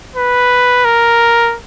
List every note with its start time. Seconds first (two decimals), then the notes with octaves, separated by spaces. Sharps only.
0.16 B4
0.85 A#4